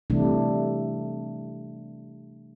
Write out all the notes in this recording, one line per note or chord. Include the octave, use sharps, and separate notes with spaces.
C3 E3 G3 A3 D4